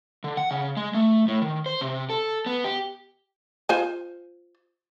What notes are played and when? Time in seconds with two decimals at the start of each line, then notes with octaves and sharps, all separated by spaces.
0.24 D3
0.37 F#5
0.51 C#3
0.77 G#3
0.94 A3
1.28 A2
1.42 D#3
1.66 C5
1.81 C3
2.10 A4
2.46 B3
2.64 G4
3.69 F4 C5 G#5